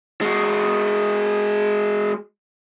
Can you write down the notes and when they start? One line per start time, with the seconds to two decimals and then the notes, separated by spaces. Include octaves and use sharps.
0.21 G#3 F#4